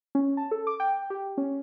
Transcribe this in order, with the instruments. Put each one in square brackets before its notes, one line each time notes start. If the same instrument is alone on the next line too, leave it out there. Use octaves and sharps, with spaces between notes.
[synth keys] C#4
A5
A4
D6
G5
G4
C#4